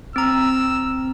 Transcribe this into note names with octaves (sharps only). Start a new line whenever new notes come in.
C4 A#5 E6